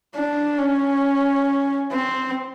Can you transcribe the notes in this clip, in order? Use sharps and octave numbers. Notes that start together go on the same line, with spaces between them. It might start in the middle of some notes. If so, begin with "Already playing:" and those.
D4
C#4
C4